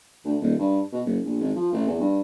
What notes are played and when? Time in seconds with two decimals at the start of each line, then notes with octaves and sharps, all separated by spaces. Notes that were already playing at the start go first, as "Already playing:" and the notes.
0.24 D2
0.41 D#1
0.59 G2
0.92 B2
1.05 F#1
1.25 A#1
1.40 G#1
1.56 F3
1.72 A1
1.87 E2
2.00 G2